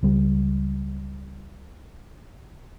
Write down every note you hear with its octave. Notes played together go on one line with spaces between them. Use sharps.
C#2 G3